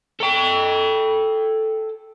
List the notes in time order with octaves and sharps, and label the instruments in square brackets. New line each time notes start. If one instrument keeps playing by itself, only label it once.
[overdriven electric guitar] A4 G5